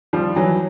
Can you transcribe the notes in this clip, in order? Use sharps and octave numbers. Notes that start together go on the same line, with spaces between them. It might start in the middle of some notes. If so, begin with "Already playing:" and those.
F3 G3
E3 F#3